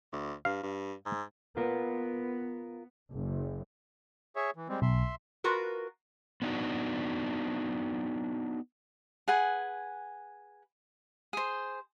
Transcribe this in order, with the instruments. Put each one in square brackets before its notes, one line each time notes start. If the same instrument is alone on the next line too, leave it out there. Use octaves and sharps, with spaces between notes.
[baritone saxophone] D2
[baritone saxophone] G2 [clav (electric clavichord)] F5
[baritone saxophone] G2
G#2
[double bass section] B3 [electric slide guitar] F4 A#4
[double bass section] F#1
[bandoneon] G#4 C#5 E5
E3
G3 G#3 C4
[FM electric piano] B1 [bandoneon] E5 C6
[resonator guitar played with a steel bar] F4 F#4 A#4 B4
[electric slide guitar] B3 D4 D#4 F4 F#4
[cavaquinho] G#4 B4 F#5 G#5
G#4 C5